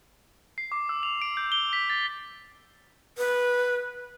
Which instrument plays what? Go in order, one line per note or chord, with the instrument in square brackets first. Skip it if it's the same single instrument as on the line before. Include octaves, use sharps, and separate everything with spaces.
[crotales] C7
D6
E6
F7
D7
G6
G7
B6
A6
[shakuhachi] B4